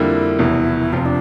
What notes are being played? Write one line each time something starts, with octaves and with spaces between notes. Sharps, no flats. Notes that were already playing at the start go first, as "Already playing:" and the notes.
Already playing: F2 D3 G3 A#3 E4
F1 E2 B2
F1 F2 C3 F3 F4
D4